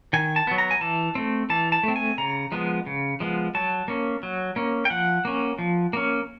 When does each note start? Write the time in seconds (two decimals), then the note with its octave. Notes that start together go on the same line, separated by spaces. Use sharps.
0.13 D#3 G#5
0.36 A5
0.47 F#3 B3
0.58 A#5
0.71 G#5
0.81 E3 A5
1.15 A3 C4
1.50 E3 A5
1.72 A5
1.83 A3 C4
1.96 G#5
2.18 C#3 A#5
2.52 F3 G#3 B3
2.86 C#3
3.20 F3 G#3 B3
3.55 F#3 A5
3.88 A#3 C#4
4.23 F#3
4.56 A#3 C#4
4.85 G5
4.90 F3 F#5
5.25 A#3 C#4
5.58 F3
5.93 A#3 C#4